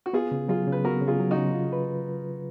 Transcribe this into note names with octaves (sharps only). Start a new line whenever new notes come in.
F#4
B3 F4 G#4
C#3
F#3 F4 G#4
C#3
B4
B3 F#4 A#4
C#3
F4 G#4
F#3
D#4 F#4
C#3
F4
B4